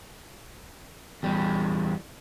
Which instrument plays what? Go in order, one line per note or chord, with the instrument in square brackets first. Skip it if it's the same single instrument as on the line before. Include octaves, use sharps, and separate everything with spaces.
[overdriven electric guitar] E2 G3